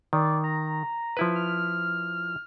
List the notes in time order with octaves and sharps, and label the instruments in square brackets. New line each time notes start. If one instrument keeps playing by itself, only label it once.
[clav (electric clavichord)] D#3 [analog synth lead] D5
[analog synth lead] A#5
[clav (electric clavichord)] F3 E4 B4
[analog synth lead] F6